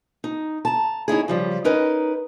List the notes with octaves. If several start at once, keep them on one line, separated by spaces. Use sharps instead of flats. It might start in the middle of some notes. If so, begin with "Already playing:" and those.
D#4
A5 A#5
C#4 D#4 E4 G#4
C#3 F3 G3
C#4 D#4 A#4 B4 D#5